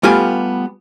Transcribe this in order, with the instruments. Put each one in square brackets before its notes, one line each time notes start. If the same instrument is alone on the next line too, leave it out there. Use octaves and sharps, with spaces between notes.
[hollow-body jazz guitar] G3 A3 B3 F4 G4 G#5